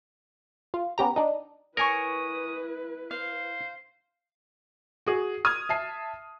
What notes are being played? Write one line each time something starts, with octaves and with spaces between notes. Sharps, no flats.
F4
B3 C#4 G4 A#5
D4 D#4
E4 A#4 B4 C#5 G#5 C#6 D#6
C5 F5
F#4 G#4
D#6 F6 G#6
E5 A5 C7